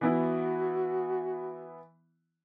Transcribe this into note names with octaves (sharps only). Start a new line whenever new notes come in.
E3 B3 E4 F#4